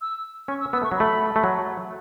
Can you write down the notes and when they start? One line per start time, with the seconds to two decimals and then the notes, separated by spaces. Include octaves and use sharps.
0.01 E6
0.48 C#4 C#6
0.60 E6
0.73 B3 E6
0.82 A3 C#6
0.92 F#3
0.96 A3 B5
1.36 A3
1.44 F#3